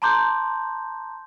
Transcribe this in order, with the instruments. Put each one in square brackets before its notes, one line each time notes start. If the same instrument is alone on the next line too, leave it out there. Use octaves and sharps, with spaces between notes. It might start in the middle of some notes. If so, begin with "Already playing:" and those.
[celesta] A5 A#5 C6 D6 G6